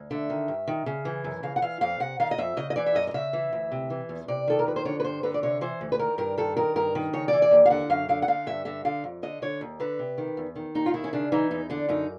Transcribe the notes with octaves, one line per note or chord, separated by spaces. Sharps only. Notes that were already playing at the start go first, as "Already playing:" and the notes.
Already playing: D2
D3 E5
D#3
G2
D#3
C#3
E3
F#2
C#3 F5
F#5
E3 F5
F2 F5
C3 F#5
D#3 F5
D#5
F2 E5
C#3 D#5
D#5
E3 D5
E5
F#2 D#5
D#5
C#3 E5
E3
D2
C3
E3
E2
C3 D5
D#3 A4
A#4
F2 B4
C5
D3 C#5
B4
G2 C5
D3 B4
D5
C3 C#5
E3 C5
D2
B4
D#3 A#4
G2 A#4
D#3 A4
D#3 A#4
G2 A#4
D#3
C#3 C#5
E3 D5
D5
D#2
F5
D3 F#5
F#2 F5
D3 F5
F#5
D3 F5
G2 E5
D3 E5
D3 F5
F2
D3 D#5
D3 C#5
D#2
D3 B4
C3
D#3
E2
D#3
D#2 D#4
F4
D#3 E4
C#4
C#3 D4
E3 D#4
E2 D#4
D3 D4
F#2 D#4